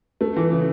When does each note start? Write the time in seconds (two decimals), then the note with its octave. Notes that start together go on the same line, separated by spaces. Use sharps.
0.21 A3
0.36 E3
0.52 C#3